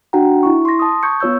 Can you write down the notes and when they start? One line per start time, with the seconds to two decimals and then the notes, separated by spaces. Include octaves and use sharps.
0.13 D4 D#4 F#4 F#5 G5 A#5
0.43 E4 C#6
0.65 C6 A#6
0.79 A5 D#6
1.03 C#6 G6 G#6 C#7
1.20 B3 F4 C#5 E6 G6